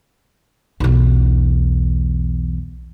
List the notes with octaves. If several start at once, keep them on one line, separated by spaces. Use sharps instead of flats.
B1 E2